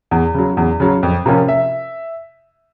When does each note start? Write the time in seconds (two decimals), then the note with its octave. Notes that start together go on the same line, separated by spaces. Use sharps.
0.11 E2
0.34 C#3 F#3
0.57 E2
0.80 C#3 F#3
1.03 F2
1.26 C3 F3 A#3 C#4
1.48 E5